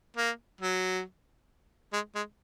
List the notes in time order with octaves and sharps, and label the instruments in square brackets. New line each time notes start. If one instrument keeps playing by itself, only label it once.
[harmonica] A#3
F#3
G#3
G#3